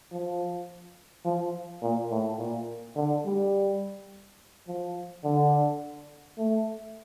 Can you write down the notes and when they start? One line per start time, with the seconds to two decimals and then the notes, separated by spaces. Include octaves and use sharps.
0.12 F3
1.25 F3
1.82 A#2
2.11 A2
2.39 A#2
2.96 D3
3.25 G3
4.68 F3
5.24 D3
6.38 A3